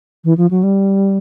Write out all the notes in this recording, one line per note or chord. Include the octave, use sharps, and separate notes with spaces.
E3
F3
F#3
G3